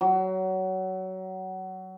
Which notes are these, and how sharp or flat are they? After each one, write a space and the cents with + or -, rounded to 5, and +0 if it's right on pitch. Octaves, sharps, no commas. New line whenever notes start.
F#3 +20